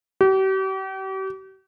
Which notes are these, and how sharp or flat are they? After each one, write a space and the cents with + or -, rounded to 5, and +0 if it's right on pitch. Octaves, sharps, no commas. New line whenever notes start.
G4 -40